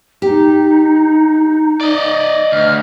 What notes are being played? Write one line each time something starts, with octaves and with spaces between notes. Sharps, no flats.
D#4 G4
D5 D#5
D2 F6